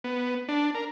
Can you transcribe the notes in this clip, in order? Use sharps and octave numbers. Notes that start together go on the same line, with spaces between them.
B3
D4
A#4